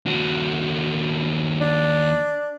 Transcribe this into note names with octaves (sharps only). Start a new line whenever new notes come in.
D#2 F#4
D4